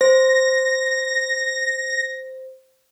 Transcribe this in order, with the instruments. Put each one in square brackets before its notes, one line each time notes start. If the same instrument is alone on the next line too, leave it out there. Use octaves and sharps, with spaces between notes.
[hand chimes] C5 [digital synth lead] A#6